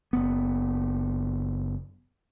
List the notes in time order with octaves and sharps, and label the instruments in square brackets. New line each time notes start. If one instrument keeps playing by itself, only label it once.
[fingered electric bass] F#1 B3